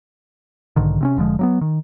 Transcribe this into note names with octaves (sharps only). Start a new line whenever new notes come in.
B1 G#2 D3 D#3
C3 C4 C#4
F1 D3 F3 G#3
F#3 A#3 B3
D#3